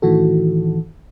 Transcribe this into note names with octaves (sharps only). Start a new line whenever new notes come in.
A2 D#3 E3 F#4 A4